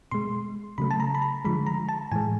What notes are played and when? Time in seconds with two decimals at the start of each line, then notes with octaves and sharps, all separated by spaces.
0.11 B2 G#3 C6
0.78 C#3 F#3 A3 B5
0.91 A5
1.00 A#5
1.15 B5
1.22 A#5
1.45 D3 F3 G#3 B5
1.67 A#5
1.89 A5
2.12 A2 E3 G#3 G#5